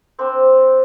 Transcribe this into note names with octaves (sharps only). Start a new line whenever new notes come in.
C4 D4 C5 G5